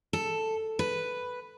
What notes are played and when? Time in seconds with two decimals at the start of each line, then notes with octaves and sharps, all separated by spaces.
0.13 A4
0.79 B4